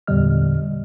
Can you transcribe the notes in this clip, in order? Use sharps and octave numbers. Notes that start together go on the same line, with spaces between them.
E2 A#2 D3 G3 D#5 F6